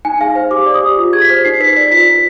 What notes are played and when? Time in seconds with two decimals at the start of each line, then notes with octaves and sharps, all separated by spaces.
0.05 D#4 G#5
0.21 G#4 F5
0.35 C5 F5
0.51 G4 D6
0.66 D5
0.74 D#6
0.82 G4
0.98 F4
1.13 G#4 G#6
1.22 B6
1.30 C5
1.44 D#4 C7
1.60 B4 B6
1.76 D5 B6
1.91 F4 B6
2.06 B4